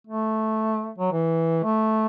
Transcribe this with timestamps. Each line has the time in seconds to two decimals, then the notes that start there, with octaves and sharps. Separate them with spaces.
0.07 A3
0.98 F#3
1.12 E3
1.64 A3